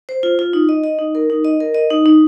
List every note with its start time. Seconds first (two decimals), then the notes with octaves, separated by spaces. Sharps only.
0.09 C5
0.23 F4
0.39 F4
0.53 D#4
0.69 D#5
0.84 D#5
0.99 D#4
1.15 A#4
1.30 D#4
1.45 D#5
1.60 A#4
1.74 D#5
1.90 D#4
2.06 D#4